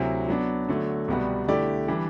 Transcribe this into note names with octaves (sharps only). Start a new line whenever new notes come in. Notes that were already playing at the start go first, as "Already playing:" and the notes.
Already playing: D2 C3 F#3 C4 E4
F#3 B3 D4
D3 F#3 A3
C2 B2 G3 B3 F#4
D3 A3 E4 G4 D5
E3 G3 D4